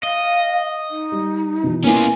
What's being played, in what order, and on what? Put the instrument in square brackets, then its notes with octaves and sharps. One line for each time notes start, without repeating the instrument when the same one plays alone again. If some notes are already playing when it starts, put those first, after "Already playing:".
[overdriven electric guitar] D#5 [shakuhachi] F5
[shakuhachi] D#4
[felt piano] G3
B2 E3
[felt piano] A#3 B3 E4 [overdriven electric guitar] C#4 F4 [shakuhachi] G#5